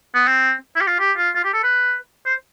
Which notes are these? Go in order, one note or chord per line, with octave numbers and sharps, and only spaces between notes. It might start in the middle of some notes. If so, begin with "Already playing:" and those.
B3
C4
E4
G4
F4
G4
F4
F4
G4
A4
B4
C5